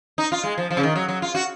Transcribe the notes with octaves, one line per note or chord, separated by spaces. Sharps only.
D#4
F4
G#3
F3
F3
C#3
D#3
F#3
F#3
F4
F#4